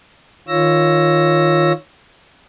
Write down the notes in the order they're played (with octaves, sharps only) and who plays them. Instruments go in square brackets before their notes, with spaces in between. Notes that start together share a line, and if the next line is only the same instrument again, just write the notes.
[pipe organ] D#3 F4 C#5 E6 A#6